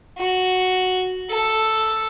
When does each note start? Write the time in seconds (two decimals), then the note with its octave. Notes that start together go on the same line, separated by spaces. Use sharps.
0.18 F#4
1.31 A4